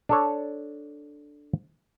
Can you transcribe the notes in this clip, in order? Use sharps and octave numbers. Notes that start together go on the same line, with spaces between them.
D4 A4 C#5